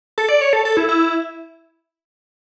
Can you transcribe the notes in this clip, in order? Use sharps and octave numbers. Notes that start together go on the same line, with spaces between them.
A4
D5
C#5
A4
A4
E4
E4